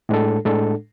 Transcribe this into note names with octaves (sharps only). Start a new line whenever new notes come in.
A2 G#3 D4 A4
A2 G#3 D4 A4